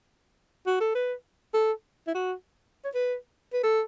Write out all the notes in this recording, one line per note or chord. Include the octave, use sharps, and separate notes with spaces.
F#4
A4
B4
A4
E4
F#4
C#5
B4
B4
A4